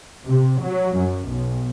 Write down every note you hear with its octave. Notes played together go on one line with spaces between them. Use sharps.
C3
F#3
F#2
B1